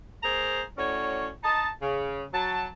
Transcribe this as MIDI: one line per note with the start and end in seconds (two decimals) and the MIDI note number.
0.23 0.61 58
0.23 0.61 68
0.23 0.61 72
0.23 0.61 82
0.78 1.28 45
0.78 1.28 61
0.78 1.28 66
0.78 1.28 73
0.78 1.28 74
1.44 1.68 63
1.44 1.68 75
1.44 1.68 81
1.81 2.23 49
2.33 2.67 54
2.33 2.67 81